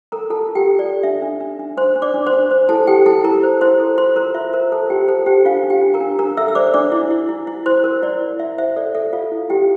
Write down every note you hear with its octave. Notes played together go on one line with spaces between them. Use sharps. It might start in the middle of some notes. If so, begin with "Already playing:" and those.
A4 A#4 A#5
F4 A4 A5
F4
G4 G5
A4
D5
A4
D4 E5
D4
D4
D4
D4 C5 C6
D4
D5 D6
D4
C5 C6
D4
C5
E4 A4 A5
G4 A4 G5
E4 A4 A5
E4 A#4 A#5
C5
E4 C5 C6
A4
F4 C5 C6
A#4 C5 A#5
F4 E5
A#4 C5 A#5
A4 C5 A5
F4 G4 G5
A4 C5 A5
G4 C5 G5
D4 F4 F5
D4
G4 G5
D4
A#4 A#5
D4
D4 A#4 A#5
A4 E5 E6
E6
C5 D5 D6
D4 D5 D6
E4
E4
E4
E4
E4 C5 C6
A#4
E4 D5
E4
E4 E5
C5 E5
A4 D5
A4 E5
F4 A4 F5
E4
E4 G4 G5